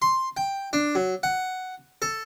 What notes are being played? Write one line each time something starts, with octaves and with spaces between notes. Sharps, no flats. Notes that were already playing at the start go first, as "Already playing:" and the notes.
C6
G5
D4
F#3
F#5
A4